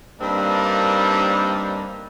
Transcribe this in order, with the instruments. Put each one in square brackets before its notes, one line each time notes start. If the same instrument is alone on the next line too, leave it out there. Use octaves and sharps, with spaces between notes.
[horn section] G2 G3 A#3 C4 D4 D#4